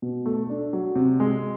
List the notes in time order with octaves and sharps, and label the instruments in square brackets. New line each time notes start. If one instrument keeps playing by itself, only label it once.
[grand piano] B2
A3
D4
F#3
C3
G#3